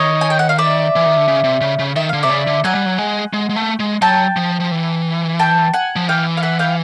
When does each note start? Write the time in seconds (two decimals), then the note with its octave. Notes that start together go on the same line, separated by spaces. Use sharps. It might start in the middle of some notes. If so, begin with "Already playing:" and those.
Already playing: D#3 C#5 D#5
0.21 G#5
0.30 G5
0.39 F#5
0.49 F5
0.58 D5 E5
0.96 E3
1.06 D#3
1.17 D3
1.28 C#3
1.44 C3
1.61 C#3
1.79 C#3
1.96 D#3 E5
2.09 D3 F5
2.23 C3 D5 E5
2.30 C#3
2.47 D3
2.64 F#3 F#5 G#5
2.75 G3
2.86 F#3
2.99 G#3
3.33 G#3
3.49 G#3
3.56 A3
3.80 G#3
4.02 F#3 G5 A5
4.36 F3
4.60 F3
4.71 E3
5.39 G5 A5
5.74 F#5 G#5
5.96 F3
6.08 E3 F5 G5
6.37 F5
6.43 E5 F#5
6.59 F5 G5